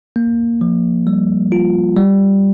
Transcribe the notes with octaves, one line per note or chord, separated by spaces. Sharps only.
A#3
F3
G3
F4
G3